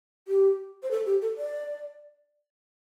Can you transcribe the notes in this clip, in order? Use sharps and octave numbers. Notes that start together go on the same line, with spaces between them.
G4
C5
A4
G4
A4
D5